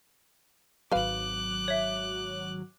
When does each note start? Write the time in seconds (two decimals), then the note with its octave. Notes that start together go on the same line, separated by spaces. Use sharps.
0.91 G#1 F#3 B4 F5 D6 F#6
1.68 C#5 E5